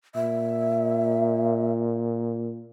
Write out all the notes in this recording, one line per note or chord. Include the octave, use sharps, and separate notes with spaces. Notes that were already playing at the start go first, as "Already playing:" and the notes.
A#2 E5